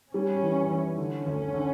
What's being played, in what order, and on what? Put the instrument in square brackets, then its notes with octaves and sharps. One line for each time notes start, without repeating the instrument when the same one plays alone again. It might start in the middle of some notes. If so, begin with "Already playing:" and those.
[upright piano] G3 [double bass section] C#4
[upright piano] E3
E3
[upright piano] D3 [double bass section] C#4
[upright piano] D2
D3